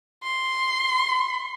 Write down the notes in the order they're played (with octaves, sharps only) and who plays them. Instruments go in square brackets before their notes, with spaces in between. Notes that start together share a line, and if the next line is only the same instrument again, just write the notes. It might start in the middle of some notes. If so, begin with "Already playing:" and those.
[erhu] C6